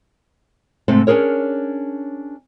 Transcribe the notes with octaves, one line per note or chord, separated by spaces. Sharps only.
G#2 C3 A3 C4
C#4 D4 G#4 A#4 C#5